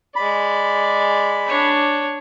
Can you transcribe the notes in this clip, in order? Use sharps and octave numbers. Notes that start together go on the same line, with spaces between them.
G#3 D5 B5
D4 C#5